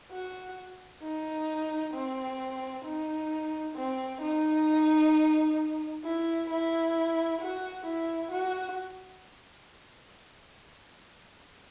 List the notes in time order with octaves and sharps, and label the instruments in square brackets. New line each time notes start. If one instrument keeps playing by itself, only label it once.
[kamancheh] F#4
D#4
C4
D#4
C4
D#4
E4
E4
F#4
E4
F#4